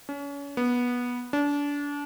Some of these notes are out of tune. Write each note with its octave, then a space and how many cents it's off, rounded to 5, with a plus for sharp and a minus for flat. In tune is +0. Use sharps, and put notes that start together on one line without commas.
C#4 +35
B3 -15
D4 -30